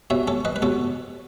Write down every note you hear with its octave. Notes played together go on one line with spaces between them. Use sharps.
B2 C#5 E5
A4 C#5
B4 D#5
B4
B2 A4 C#5